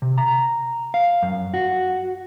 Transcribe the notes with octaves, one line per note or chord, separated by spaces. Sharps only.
C3
A#5
F5
F#2
F#4